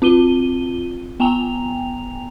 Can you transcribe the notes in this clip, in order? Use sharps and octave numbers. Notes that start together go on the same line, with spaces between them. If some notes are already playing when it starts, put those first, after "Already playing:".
C4 F4 D#7 G7
B3 G5 G#5 A#5 F7